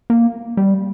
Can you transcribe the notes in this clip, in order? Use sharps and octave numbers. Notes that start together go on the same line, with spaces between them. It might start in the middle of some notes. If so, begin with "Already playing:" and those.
A#3
G3